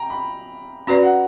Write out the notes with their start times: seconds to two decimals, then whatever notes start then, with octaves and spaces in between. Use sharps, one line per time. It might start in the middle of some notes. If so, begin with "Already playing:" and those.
Already playing: G5 A#5
0.10 B5
0.87 C#4 F#4 B4 D5 A#5
1.03 F#5